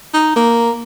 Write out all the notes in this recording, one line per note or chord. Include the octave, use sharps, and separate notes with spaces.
D#4
A#3